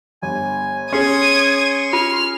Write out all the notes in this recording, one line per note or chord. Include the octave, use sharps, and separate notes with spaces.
G1 G#5
C#4 G#4 C6 C#6 D#6 G#6
F4 F6